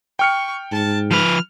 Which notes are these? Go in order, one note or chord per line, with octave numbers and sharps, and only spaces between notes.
G5 C#6 F6 C#7
G#2 A5
F3 B4 F6